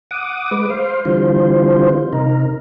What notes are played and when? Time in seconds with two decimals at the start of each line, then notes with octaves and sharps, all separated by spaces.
0.11 F#5 D6 D#6
0.51 G#3 B4 D6
0.70 C5 F5
1.05 D3 E3 G3 C4 F4 C5
2.13 C3 D#4 A#4